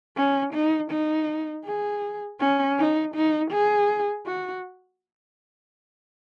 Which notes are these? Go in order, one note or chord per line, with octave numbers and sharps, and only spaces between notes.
C#4
D#4
D#4
G#4
C#4
D#4
D#4
G#4
F#4